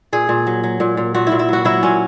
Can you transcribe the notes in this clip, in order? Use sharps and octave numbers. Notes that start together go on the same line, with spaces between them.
A#2 G#4
A#2
F#3
F#3
A#2
A#2
A#2 F#4
E4
A#2
E4
F#3 F#4
F#3 E4
A#2 C#4